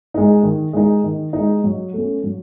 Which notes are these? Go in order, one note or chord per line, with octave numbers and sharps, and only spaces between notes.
G#3 D#4
D#3
G#3 D#4
D#3
G#3 D#4
F#3
A3 C#4
F#3